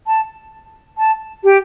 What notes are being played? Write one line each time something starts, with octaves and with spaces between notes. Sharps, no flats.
A5
A5
G4